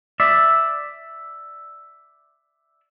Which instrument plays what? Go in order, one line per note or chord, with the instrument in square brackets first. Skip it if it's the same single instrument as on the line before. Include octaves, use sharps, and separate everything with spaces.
[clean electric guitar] D5 E5